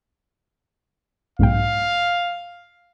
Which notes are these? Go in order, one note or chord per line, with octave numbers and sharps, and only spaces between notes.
B1 G#2 F5 G5